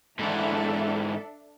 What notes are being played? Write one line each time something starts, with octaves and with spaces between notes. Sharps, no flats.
G#2 E3 D4 A4 E5